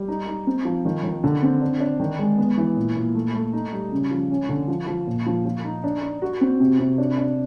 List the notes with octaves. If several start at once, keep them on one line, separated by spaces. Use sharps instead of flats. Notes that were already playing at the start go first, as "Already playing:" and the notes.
Already playing: G3
D#4
D#4
C4
F3
D#3
D#3
D3
C4
D4
D4
D#3
G#3
B3
E3
A#2
A#2
A3
A3
D#4
G3
C#3
F3
C#4
D3
F3
F3
A#2
F3
F3
D#4
D4
D4
F#4
C4
C3
C3
D4
D4